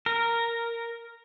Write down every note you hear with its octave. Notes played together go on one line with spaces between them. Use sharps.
A#4